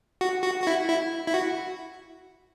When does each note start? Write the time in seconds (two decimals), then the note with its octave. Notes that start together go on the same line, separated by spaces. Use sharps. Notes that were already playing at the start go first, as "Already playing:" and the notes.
0.21 F#4
0.44 F#4
0.62 F#4
0.67 E4
0.88 E4
1.27 E4
1.34 F#4